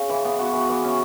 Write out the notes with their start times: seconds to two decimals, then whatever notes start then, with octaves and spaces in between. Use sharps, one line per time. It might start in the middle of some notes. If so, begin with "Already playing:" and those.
Already playing: C#3
0.09 E3
0.25 B3
0.39 F#4
0.53 E3
0.69 E3
0.84 C#4